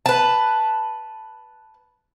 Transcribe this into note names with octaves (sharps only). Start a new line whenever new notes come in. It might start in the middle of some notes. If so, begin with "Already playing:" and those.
B4 A5